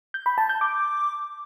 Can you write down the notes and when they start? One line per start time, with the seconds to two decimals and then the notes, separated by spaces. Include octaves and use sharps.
0.14 G6
0.26 B5
0.38 A5
0.49 G6
0.61 D6